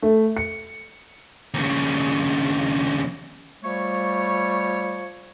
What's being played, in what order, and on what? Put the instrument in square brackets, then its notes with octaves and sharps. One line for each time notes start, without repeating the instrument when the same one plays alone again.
[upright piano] A3
C#7
[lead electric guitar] D#2 C#3
[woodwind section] F3 G3 A3 C#5